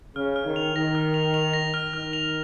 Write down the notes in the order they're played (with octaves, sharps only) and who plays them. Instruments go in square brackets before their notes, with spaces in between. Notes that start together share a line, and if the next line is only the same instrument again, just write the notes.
[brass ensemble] C#3 [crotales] F6
[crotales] F6
[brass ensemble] D#3
[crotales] F7
[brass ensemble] D#3 [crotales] A#6
[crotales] F6
F7
F7
A#6
F6
[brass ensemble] D#3 [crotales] F6
[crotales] F7